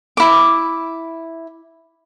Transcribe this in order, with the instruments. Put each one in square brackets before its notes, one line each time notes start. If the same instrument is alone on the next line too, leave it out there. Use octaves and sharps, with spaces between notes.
[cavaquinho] E4 D6